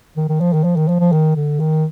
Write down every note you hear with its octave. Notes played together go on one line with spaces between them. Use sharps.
D#3
D#3
F3
D#3
F3
D#3
F3
F3
D#3
D3
D#3